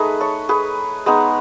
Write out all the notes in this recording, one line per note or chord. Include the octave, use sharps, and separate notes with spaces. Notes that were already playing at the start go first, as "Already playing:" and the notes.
Already playing: A3 D#4 G#4 B4
A4 C#5
G#4 B4
G#3 B3 D#4